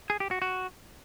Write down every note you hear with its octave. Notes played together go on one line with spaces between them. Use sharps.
G#4
G4
F#4
F#4